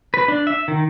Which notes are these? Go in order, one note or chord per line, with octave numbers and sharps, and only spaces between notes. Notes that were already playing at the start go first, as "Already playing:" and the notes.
B4
D4
E5
D#3